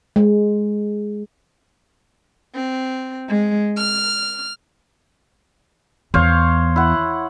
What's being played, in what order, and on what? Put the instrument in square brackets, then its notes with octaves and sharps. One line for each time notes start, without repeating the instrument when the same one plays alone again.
[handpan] G#3
[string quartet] C4
G#3
F6
[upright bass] E2 [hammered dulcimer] C5 C#5 F5
[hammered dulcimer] E4 F#5